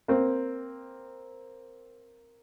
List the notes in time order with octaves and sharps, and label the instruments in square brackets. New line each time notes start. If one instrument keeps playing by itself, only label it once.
[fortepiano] A#3 C4